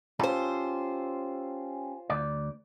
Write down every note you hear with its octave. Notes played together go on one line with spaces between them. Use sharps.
C#4 F4 G4 A4 C5
D2 D5